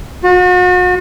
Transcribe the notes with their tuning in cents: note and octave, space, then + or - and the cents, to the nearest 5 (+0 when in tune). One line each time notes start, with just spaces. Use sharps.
F#4 -40